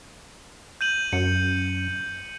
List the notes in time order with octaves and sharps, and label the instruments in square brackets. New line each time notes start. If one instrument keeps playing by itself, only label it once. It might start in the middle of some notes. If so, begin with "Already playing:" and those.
[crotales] G6 D#7 F#7
[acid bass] F#2 [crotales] C#7